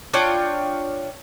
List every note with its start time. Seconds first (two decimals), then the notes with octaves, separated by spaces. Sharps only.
0.13 D4 F4 C#5 G5